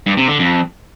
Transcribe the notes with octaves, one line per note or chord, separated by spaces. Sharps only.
G2
C3
D3
F2